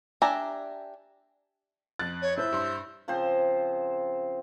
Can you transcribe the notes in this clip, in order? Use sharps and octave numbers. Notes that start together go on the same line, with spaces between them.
D4 G4 E5 G#5 A#5
F2 F#6 A6
C#5
E4 C5 E5 G6
G2 C6
C#3 F3 C4 C5